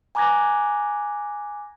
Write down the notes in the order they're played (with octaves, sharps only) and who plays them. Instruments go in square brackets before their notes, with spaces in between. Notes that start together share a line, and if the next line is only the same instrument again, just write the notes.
[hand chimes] G#5 A#5 D6 F#6 G#6 A#6